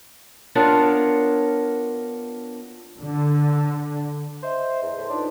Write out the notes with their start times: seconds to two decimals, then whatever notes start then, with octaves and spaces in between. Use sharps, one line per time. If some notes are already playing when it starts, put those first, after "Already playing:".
0.55 B3 D4 F4 A#4 C#5
3.01 D3
4.43 C5 D#5 E5
4.82 E2
4.98 A2 B4 C#5 C6
5.10 D4 D#4 F4